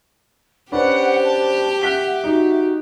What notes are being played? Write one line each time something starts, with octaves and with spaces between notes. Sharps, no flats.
C#4 D4 G4 B4 C5 F#5
A5
E5 F#5 F#6 B6 G7
D#4 F#4